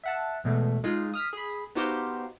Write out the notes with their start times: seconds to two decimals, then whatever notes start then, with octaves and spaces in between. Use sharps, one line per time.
0.03 E5 F#5 A5
0.44 E2 B2 G#3 A3
0.84 G#3 D#4 F4 G#4
1.14 D#6 F6 B6
1.33 G#4 B5
1.75 B3 D#4 F#4 G4 C5 F5